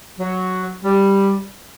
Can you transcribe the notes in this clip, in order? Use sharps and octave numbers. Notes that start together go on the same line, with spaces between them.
F#3
G3